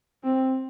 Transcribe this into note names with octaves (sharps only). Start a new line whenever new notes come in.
C4